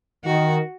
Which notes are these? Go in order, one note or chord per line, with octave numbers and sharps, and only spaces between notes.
D#3 F#4